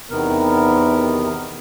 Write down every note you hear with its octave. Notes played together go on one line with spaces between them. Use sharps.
E2 C3 D#3 B3 A#4